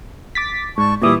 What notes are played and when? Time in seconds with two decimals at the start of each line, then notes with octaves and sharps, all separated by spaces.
0.35 D6 A6 B6
0.78 G#2 D5 A5 C#6
1.02 A#2 E3 G3 E4 D6 D#6